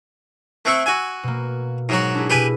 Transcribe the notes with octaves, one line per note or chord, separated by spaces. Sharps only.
A3 C4 C#6 E6 F#6 G#6
F#4 G#5
B2 A#3
G#2 F#3 F#4 A#4
D4 E4 G#4
B2 E4 G4 B4 G#5